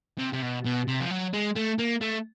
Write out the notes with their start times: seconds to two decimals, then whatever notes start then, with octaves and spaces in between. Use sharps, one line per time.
0.19 C3
0.33 C3
0.43 B2
0.65 B2
0.88 C3
1.00 F3
1.11 F#3
1.34 G#3
1.56 A3
1.79 A#3
2.01 A3